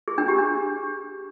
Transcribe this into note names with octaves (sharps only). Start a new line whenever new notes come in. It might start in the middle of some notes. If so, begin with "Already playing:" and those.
G#4
D4
G4
D4